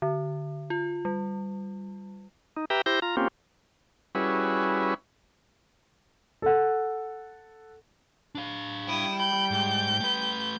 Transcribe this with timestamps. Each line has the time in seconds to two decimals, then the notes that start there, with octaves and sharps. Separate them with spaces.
0.02 D3
0.70 F4
1.05 G3
2.57 D#4
2.70 G4 B4 E5 G5 A#5
2.86 E4 G4 C5 G6 A#6
3.02 F4 A#5
3.17 A#3 C4 C#4 F4 G4
4.15 G3 C#4 E4 F#4 G#4 B4
6.42 A4 F#5
8.35 D4 F5
8.87 G3 E4 G5 D#6
9.20 B5 G6
9.51 G#2
10.00 A3 B4